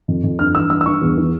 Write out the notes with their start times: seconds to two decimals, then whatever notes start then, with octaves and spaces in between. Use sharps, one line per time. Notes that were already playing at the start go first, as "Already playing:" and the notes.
0.08 F2
0.24 F2
0.39 G2 F6
0.54 E3 E6
0.70 G2 E6
0.81 E6
0.86 G2 C#6
1.02 E2
1.17 E3